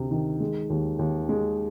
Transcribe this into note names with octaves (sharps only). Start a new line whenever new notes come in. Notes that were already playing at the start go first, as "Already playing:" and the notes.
Already playing: D2 C3
D#3
G#3
D#2
D#2
G#3